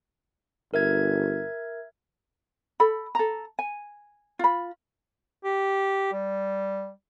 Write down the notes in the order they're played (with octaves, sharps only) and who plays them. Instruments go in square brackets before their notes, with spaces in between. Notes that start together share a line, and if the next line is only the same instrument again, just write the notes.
[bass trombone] G1 [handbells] A#4 E5 G#6
[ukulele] A4 B5
A4 A#5
G#5
F4 B5
[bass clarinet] G4
G3